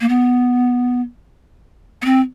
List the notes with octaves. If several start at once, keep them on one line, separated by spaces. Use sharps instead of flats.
A#3
B3
B3
C4